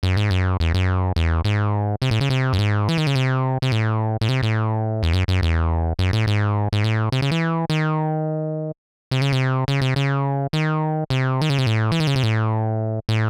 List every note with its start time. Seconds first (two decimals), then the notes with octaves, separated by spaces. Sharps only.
0.03 F#2
0.17 G#2
0.31 F#2
0.60 E2
0.74 F#2
1.16 E2
1.45 G#2
2.02 C3
2.11 A2
2.21 C#3
2.30 C3
2.53 F#2
2.59 G#2
2.89 E3
2.98 D#3
3.07 C#3
3.15 C3
3.62 C3
3.72 A2
4.21 A2
4.29 C3
4.43 A2
5.03 E2
5.13 F#2
5.28 F#2
5.42 E2
5.99 F#2
6.13 A2
6.27 G#2
6.73 G#2
6.84 A2
7.12 C3
7.22 C#3
7.31 E3
7.70 D#3
9.11 C3
9.22 C#3
9.32 C3
9.68 C#3
9.82 C3
9.96 C#3
10.53 D#3
11.10 C3
11.41 D#3
11.50 C#3
11.58 C3
11.67 A2
11.92 E3
12.00 D#3
12.07 C#3
12.16 C3
12.23 A2
13.09 A2